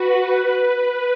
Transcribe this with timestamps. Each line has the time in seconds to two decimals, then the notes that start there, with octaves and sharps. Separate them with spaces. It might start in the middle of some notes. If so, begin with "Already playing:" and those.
Already playing: F#4 B4
0.27 B4